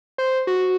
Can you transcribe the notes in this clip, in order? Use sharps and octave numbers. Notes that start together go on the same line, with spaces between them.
C5
F#4